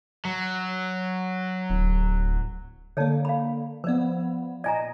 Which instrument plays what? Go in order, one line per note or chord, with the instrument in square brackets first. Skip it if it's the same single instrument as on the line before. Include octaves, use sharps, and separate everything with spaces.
[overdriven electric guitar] F#3
[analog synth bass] D1
[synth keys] D3 A#3 [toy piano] C#5 D5 A5
[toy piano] F5 B5
[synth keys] F3 B3 [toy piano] B4 D5
[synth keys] A#2 D#5 [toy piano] D5 G#5 A#5